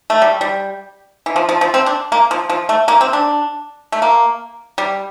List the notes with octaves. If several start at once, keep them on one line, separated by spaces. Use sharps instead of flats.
A3
G3
G3
E3
F3
F3
F3
C4
D4
A#3
F3
F3
A3
A#3
C4
D4
A3
A#3
G3